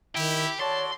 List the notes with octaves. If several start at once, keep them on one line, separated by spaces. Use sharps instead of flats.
D#3 E4 G4
F#4 A4 C#5 D5 A5 C6